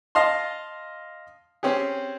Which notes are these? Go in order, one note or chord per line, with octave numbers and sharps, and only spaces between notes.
D#5 F5 A5 C6
C4 C#4 G4 G#4